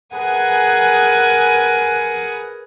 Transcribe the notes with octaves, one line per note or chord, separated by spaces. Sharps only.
G#4 A#4 B4 F#5 G#5